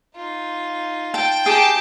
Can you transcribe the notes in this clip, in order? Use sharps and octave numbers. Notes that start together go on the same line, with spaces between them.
D#4 F4
G5 A5
G4 G#4 A5